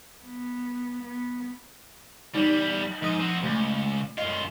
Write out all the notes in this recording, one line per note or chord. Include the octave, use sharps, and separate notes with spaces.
B3
B3
E2 G3 D#4 F#7
G#2 F3 D#6 D#7
C4 F#4
C#2 A3
F#2 F4 D#5